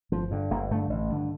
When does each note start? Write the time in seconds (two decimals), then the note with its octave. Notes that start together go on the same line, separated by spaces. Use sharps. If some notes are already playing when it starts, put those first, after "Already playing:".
0.12 G1 F3
0.31 G2 D3
0.50 G1 A#3
0.71 G2 A3
0.74 D3
0.90 A1
1.10 G2 D3